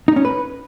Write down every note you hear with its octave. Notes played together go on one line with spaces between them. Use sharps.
D#4
C#4
B4